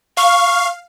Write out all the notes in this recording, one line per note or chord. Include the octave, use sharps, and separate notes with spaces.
F5 C#6